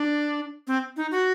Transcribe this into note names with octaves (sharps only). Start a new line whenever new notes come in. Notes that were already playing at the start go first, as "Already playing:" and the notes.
Already playing: D4
C4
D#4
F#4